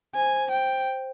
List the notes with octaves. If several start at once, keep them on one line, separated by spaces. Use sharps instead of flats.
C5 G#5
G5